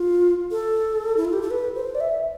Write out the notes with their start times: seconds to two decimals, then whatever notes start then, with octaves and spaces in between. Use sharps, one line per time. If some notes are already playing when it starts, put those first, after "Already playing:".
Already playing: F4
0.51 A4
1.17 E4
1.25 F4
1.33 G4
1.42 A4
1.51 B4
1.75 C5
1.95 D5
2.00 E5